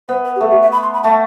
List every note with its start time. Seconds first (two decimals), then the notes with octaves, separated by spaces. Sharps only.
0.08 B3 C5
0.25 B4
0.36 G4
0.41 A3 A4
0.51 G4
0.61 E5
0.72 B5
0.83 C6
0.93 B5
1.04 A3 A5